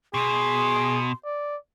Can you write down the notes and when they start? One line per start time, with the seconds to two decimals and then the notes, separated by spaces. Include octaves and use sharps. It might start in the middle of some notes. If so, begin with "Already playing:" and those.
0.14 B2 G#4 C6
1.25 D5